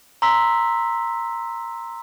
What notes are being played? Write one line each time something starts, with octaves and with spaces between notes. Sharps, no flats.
A#5 C6 E6 B6